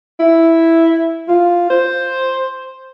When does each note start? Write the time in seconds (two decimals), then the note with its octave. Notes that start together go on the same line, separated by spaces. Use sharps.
0.20 E4
1.28 F4
1.70 C5